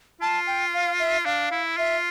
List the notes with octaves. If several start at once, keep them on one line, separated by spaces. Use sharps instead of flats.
F4 A5
G5
F5
E5
D4 F5
E4
F4 E5